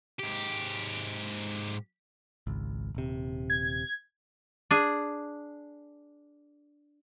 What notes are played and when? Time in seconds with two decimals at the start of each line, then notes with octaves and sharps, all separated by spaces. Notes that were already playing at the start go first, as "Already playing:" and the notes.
0.20 G#2 G4
2.47 G#1 C#2
2.95 D#1 C3
3.50 G#6
4.71 D4 G#4